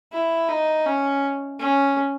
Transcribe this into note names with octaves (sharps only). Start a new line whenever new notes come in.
E4
D#4
C#4
C#4